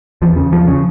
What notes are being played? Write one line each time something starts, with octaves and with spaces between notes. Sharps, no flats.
E2 F3
C#3
E2 F3
C#3